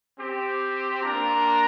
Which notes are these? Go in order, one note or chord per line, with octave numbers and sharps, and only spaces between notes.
C4 G4
A#3 D4 F4 A#5